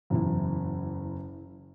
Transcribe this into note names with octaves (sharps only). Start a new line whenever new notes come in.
F#1 E2 E4